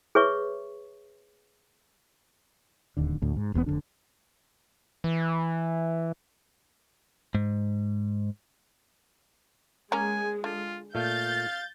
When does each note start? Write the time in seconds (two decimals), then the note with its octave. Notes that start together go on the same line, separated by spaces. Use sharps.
0.15 G#4 B4 C#5 E5 C#6
2.97 D1 D#2 D3
3.22 D2 A2
3.36 G#2
3.54 E1 E2 A2 B3
3.66 F1 C2 D3 D4
5.04 E3
7.35 G#2
9.92 G#3 A#3 C#4 G#5 A#5
10.44 D3 F4
10.95 A#2 A3 F5 G6 A6